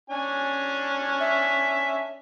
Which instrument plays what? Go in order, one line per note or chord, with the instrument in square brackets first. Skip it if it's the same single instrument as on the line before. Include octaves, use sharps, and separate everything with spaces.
[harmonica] C#4 D4 G#5
[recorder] E5